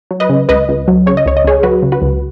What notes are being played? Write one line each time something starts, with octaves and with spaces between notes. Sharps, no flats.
F#3
B4 D#5
C#3
C#2 B4 D#5
C#2
F#3
C#3 C#5
D#5
C#2 C#5
D#5
C#2 G#4 C#5
F#3 F#4 B4
C#3
F#4 B4
C#2